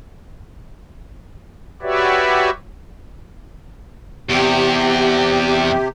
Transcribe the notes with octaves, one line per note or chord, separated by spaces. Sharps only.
F#4 G4 B4 C#5 D5 E5
E2 C3 G4